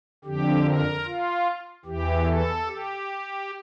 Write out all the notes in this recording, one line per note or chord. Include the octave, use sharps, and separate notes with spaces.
F2 D3 G4
A#4
F4
E2 E3 G4
A4
G4